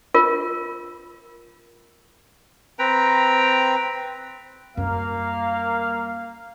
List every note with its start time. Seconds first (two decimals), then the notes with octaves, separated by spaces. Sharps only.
0.14 F4 A#4
2.79 C4 B4 G5 A#5
4.77 F#2 G3 A#3 F5